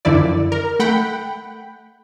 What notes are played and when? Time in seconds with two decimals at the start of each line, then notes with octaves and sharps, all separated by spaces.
0.05 F#2 D3 D#3 F3 E4 D5
0.52 A#4
0.79 A3 F#5 G5 B5